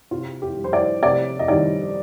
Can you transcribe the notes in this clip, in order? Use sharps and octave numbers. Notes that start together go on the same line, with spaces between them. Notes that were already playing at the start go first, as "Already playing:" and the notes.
C3 F4
G4
G3
C5
D5
C3 D5
D#5
D#3 G3 D5